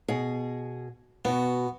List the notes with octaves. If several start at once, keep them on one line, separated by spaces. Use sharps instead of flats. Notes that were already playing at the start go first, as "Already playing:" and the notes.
B2 G#4
B2 B3 F#4